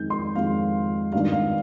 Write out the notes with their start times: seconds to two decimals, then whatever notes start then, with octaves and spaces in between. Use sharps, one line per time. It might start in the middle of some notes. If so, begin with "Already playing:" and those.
Already playing: F2 D#3 G#3 G6
0.10 C6
0.35 F2 D#3 G#3 F5
1.12 G#1 G2 D#3 F5
1.32 F5